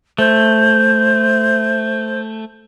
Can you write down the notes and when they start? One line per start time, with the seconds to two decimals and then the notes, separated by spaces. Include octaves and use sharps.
0.18 A3 C5